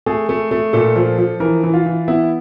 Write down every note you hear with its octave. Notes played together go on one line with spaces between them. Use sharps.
A3 G#4
A3
A3
A#2 A4
F3
F3
E3 A#4
E3
F4
E3
B3 E4